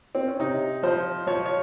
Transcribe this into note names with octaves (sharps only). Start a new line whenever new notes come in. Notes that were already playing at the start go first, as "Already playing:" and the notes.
C4
C#4
C3 D#4
F3 C5
F3 C#5
C#5